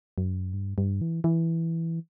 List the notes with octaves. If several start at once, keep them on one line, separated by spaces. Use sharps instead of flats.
F#2
G2
G2
E3
E3